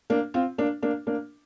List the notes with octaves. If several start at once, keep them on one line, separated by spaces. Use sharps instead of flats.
A#3 D4
C4 F4
A#3 D4
A#3 D4
A#3 D4